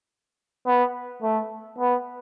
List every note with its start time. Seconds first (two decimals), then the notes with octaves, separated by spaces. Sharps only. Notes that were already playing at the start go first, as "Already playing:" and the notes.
0.66 B3
1.22 A3
1.79 B3